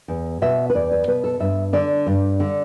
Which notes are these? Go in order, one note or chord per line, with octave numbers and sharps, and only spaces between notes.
E2
B2 E5
B4
E2 D5
B4
B2 B4
A4
G2 E5
D3 D5
G2
D3